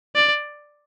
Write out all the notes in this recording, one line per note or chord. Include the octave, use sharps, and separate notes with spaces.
D5